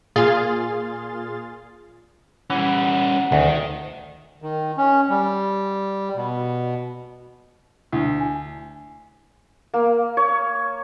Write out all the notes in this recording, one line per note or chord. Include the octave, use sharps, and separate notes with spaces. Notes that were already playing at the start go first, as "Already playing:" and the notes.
A#2 F4 G#4 F5 C6 A6
E3 G3 C#4 F#5
D2 D#3
D#3
C#4
G3
B2
D2 E4
G#5
A#3
C#5